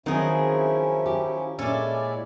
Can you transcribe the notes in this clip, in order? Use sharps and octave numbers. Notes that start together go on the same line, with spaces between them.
D#3 F3 F#3 C4 C#4 D#4 E4 G#4
G4
A#2 G#3 C#4 E4 A4 D5